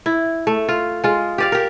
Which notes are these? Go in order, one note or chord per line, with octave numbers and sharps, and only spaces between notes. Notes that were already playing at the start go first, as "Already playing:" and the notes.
E4
A3
F4
G#3 F4
G4 D5 F5
G4 A#4